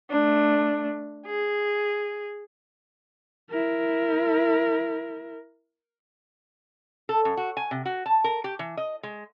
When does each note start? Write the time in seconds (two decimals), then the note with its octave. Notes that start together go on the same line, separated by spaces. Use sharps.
0.10 A3 D4
1.26 G#4
3.50 E4 A#4
7.09 A4
7.25 F#2
7.37 F#4
7.57 G#5
7.71 C3
7.86 F#4
8.06 A5
8.24 A#4
8.44 G4
8.59 E3
8.77 D#5
9.03 G#3